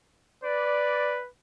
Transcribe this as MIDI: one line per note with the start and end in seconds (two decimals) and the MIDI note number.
0.44 1.29 71
0.44 1.17 74